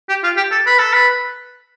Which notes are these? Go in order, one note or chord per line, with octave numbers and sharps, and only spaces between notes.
G4
F4
G4
A4
B4
A4
B4